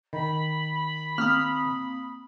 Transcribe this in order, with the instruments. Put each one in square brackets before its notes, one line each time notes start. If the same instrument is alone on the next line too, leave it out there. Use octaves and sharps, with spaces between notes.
[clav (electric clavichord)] D#3 [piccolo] B5
[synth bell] A#3 C4 D#6 [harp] F6